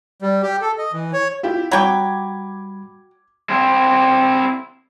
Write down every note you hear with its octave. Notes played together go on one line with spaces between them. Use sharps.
G3
G4
A4
D#5
E3
C#5
E4 F4 G4
F#3 G3 G5 B5 D6 G#6
C4 E4